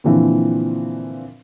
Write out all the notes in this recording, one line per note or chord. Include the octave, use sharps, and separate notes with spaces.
A#2 D3 E3 F3 C4